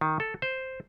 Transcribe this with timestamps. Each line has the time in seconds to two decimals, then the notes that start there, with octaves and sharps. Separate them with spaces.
0.01 D#3
0.20 A4
0.42 C5